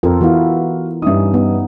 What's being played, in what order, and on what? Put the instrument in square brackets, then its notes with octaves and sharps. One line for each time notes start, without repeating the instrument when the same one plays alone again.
[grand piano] F2 [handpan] F4 A4 A#4
[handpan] E3 B3 E4 [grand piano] F#4 F5
[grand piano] G2 E5 D#6 [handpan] C#4 D#4
[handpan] B3 D#4